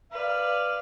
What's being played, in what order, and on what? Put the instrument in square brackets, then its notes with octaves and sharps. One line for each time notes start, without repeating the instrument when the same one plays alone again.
[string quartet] B4 D5 [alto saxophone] F5